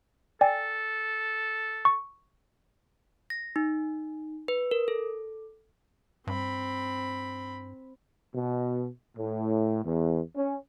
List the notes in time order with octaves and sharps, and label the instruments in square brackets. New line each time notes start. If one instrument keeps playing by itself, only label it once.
[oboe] A4 [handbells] D5 G5 G#5
[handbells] C#6
A#6
D#4
B4
A#4
A4
[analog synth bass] G2 [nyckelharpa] C4 B5
[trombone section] B2
A2
E2
C#4